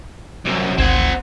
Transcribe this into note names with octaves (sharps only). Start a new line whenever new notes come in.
C2 F#2
G#1 D2 C4 F#5 G#6